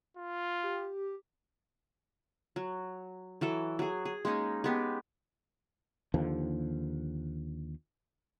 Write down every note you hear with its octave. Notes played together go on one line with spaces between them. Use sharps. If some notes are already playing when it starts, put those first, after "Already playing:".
F4
G4
F#3
E3 F#3 A4
F#3 G#4
G#4
G#3 A#3 C#4 D#4
G#3 B3 G4
D#2 D3 F3